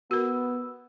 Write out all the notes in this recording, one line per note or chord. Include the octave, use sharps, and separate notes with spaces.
B3 F#4 A#4 E6